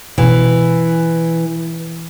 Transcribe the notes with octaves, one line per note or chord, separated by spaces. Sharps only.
B2 E3 C#4